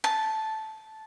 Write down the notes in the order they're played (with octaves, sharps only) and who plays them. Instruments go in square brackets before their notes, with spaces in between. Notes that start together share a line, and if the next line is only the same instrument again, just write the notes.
[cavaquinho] A5